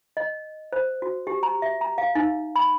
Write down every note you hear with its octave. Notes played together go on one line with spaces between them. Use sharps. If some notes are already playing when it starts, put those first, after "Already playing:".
D#5
C5
F#4
G4
A#5
E5
A#5
F5
D#4
B5